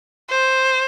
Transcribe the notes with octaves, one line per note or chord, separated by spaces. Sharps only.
C5